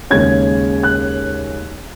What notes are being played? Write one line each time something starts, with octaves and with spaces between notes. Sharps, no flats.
D#2 C#3 G#3 C#4 G#6
F#6